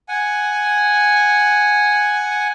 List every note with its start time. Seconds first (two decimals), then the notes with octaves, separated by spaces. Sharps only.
0.09 F#5 G#5